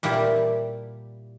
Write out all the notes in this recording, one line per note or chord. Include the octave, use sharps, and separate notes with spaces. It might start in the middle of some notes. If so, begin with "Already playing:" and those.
A#2 G3 E4 G4 D5 A5